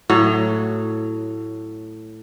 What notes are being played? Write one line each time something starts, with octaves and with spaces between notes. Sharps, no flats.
A2 F#3